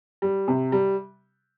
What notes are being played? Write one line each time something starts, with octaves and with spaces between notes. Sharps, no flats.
G3
C3
G3